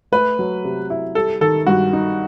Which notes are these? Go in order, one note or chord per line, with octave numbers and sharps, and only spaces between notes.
A3 B4
F#3
C3
E4
G3 A4
D#3 A4
G2 F#4
D#4